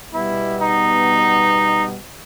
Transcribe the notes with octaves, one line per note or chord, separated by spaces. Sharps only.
B2 G3 B3 E4
D#4